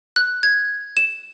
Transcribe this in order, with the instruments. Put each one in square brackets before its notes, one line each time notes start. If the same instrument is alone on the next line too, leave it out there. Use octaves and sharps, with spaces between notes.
[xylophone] F#6
G#6
E7